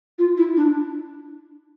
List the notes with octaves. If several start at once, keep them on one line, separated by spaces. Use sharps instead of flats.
F4
E4
D4